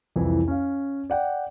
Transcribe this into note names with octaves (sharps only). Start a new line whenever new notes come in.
C2 F2 E3
C#4 F5
D5 F#5 G5